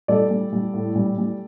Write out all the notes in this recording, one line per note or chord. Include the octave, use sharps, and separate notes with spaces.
G3 A4 D5
G3
G3
A2
G3
G3